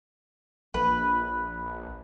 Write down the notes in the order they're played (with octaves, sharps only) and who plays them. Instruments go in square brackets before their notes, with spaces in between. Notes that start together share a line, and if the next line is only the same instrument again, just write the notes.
[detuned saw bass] A#1 [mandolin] B4